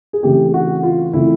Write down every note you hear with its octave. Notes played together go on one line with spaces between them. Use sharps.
G#4
C#3 E3 A3 C4 G4
F#4
F4
C#3 E3 A3 C4 E4